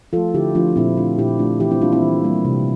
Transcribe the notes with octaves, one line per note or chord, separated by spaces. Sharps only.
F3 A3 F4 A4
D3 E4 G4
F3 A3 D4 F4
A#2 C4 E4
A3 D4 F4
A#2 E4 G4
A3 D4 F4
E3 E4 G4
C4 E4
G3 A#3 D4 F4
C4 E4
E3
G3 A#3
C3